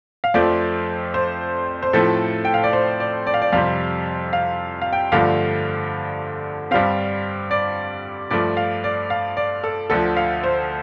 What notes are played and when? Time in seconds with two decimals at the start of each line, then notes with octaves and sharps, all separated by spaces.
0.24 F5
0.34 F2 F3 A3 C4 D5
1.14 C5
1.83 C5
1.93 A2 F3 A3 C4 A4
2.45 G5
2.54 F5
2.64 D5
2.73 C5
3.00 D5
3.27 D5
3.34 F5
3.42 D5
3.52 F2 C3 G3 C4 F5
4.33 F5
4.82 F5
4.93 G5
5.12 G2 D3 F3 A3 F5
6.71 G2 G3 C4 F5
7.51 D5
8.31 G2 F3 A3 D5
8.57 F5
8.84 D5
9.10 F5
9.37 D5
9.64 A4
9.90 D2 D3 F3 A4
10.17 F5
10.44 C5